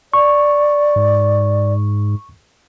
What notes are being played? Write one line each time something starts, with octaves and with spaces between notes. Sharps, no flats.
D5 C#6
G#2